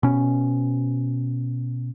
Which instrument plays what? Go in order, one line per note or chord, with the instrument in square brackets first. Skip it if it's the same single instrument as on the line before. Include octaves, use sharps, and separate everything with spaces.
[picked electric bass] B2 C#4